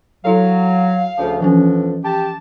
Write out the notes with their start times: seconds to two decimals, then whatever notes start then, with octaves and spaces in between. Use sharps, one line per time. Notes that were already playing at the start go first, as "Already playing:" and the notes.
0.25 F#3 E4 A4 F5
1.17 D2 C#3 F3
1.41 F2 B2 E3 F3 C#4 D4
2.04 G4 A5